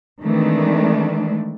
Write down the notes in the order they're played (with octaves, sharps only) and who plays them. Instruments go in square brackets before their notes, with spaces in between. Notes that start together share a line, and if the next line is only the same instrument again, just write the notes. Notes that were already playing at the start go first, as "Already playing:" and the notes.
[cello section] D#3 E3 G#3 A3 C4 D4